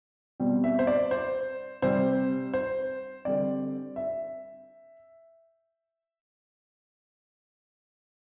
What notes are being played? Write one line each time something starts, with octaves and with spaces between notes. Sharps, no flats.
B2 G3 C4
E5
C5
D5
C5
C3 G3 C4 C5
C5
D3 G3 C4 D5
E5